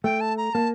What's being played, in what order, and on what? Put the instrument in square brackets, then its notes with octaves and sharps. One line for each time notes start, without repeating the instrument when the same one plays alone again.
[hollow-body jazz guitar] A3 [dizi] G5
[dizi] A5
A#5
[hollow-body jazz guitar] A#3 [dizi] A5